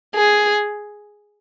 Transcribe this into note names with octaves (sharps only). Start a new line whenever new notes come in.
G#4